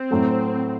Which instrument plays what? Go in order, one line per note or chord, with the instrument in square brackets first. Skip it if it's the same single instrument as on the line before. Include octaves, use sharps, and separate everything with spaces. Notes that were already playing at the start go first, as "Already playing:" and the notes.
Already playing: [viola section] C4
[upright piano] A2 F#3 A3